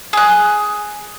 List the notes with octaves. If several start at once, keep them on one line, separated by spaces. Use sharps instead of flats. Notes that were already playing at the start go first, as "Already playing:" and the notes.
G#4 F#6